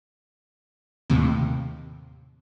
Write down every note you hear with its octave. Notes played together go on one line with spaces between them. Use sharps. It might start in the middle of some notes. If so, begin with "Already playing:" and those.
D#2 A2 C3